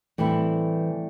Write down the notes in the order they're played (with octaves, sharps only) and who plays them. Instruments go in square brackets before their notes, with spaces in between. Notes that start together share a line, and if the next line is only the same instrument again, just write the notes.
[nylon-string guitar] A2 G3 C4 E4 [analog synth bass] E3